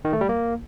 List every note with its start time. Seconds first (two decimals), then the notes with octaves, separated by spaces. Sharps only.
0.05 D#3
0.13 A3
0.21 G3
0.29 A#3